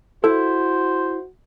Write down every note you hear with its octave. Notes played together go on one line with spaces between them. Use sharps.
E4 F#4 A4 C5